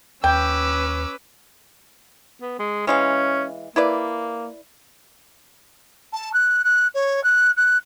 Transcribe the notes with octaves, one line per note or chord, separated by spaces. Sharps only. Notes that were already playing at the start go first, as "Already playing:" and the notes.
D#2 C#4 B4 G5 D6 E6
B3
G#3
E3 G#3 C#4 F5
A#3 E4 B4 D5
A5
F#6
F#6
C#5
F#6
F#6